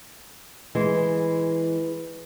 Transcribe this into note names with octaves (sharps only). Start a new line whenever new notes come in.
E3 G#3